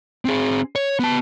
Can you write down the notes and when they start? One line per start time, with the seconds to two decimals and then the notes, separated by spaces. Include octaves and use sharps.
0.25 C4 G#4
0.75 C#5
0.99 B3 A5